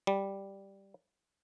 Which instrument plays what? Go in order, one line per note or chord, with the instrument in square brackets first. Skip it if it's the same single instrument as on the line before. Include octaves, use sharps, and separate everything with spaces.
[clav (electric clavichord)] G3